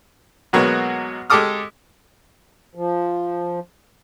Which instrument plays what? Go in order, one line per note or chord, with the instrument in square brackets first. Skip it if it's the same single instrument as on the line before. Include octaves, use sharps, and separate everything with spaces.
[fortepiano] B2 F#3 G#3 A#3 B3
G#3 G4 A4 D6 D#6 F6
[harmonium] F3